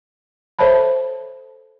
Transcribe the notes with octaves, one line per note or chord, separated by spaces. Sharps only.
A4 C5 C#5 E5 A5 B5